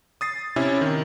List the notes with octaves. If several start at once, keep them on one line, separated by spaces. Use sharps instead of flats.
D#6 A6 C7
C3 C#4 E4
D#3